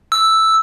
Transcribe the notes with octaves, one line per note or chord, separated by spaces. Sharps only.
E6